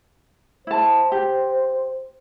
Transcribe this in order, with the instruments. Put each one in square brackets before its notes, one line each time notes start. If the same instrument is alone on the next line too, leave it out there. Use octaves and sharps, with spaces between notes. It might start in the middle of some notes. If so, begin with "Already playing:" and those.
[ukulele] E4 A5 [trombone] C5
[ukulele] G4